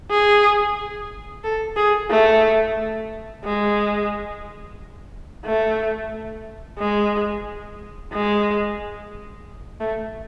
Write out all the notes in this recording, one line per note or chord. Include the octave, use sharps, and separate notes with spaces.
G#4
A4
G#4
A3
G#3
A3
G#3
G#3
A3